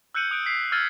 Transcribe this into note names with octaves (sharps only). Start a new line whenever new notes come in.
E6 F#6 G6 C#7 D#7 F#7
D#6 F#6 D7
B6 C7
E6 F6 G#6 A6 D#7 F#7